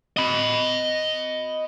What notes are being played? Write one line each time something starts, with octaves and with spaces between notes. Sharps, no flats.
D#5 B5